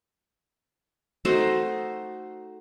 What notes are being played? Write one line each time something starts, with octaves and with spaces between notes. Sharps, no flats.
A3 D#4 F#4 C5